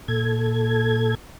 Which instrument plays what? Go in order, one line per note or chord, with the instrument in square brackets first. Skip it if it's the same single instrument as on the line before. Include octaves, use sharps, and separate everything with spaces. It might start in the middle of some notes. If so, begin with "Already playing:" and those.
[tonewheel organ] A#2 A4 G#6